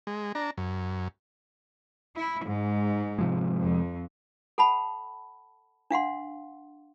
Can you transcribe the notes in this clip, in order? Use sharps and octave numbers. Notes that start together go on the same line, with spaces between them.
G#3
D4 A#5
F#2
E4
G#2
C3 F3 G#3
F2
A4 F#5 A5 B5
D4 F5 F#5 C6